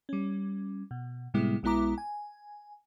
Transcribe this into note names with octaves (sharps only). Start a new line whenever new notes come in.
G3 C#4
B2
A2 C3 G3 G#3 B3 E4
B1 G#3 B3 E4 A#5 D6
G#5